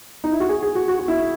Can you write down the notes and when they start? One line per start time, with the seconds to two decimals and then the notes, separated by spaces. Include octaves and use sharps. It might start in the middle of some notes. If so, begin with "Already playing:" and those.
0.24 D#4
0.32 E4
0.40 F#4
0.49 G#4
0.63 G#4
0.75 F#4
0.88 F#4
0.99 F#4
1.08 E4